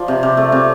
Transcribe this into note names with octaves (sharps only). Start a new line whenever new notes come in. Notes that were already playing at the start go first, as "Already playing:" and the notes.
Already playing: F3 D5
C3
C3
A3
C3